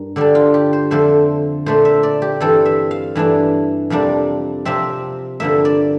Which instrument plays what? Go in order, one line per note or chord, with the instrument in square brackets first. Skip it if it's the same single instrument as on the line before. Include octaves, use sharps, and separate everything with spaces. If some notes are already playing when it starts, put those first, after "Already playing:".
Already playing: [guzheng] G2 A#4
D3 G3 D4 D5
F4
G4
C5
F2 D3 A3 C5
A#2 A3 D4 C5
E5
D5
G4
G2 E3 G3 C4 A4
E5
F5
G2 E3 A3 D4
F2 C3 G3 A#3 D4
C3 F3 C4 E5
G2 D3 F3 A#3 E5
D5